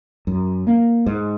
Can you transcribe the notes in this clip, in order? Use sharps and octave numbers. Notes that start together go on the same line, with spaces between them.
F#2
A#3
G#2